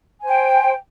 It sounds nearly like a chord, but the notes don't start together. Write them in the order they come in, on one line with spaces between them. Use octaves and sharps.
G#5 C5 G5